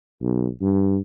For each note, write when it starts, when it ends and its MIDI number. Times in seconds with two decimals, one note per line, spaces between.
0.22 0.47 35
0.61 0.98 43